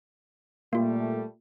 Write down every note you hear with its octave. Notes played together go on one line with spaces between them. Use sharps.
A#2 G3 A3 A#3 F4